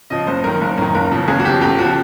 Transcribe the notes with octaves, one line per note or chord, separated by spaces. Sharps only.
C#3 F3 D#5
F#1 C5
F#2 D#3 A#4
F#1
F#2 D#3
F#1 A#4
E2 C#3 F3
F#1 G#4
F#4
E2 C#3 F3 G4
G1 G4
C#3 F3 F#4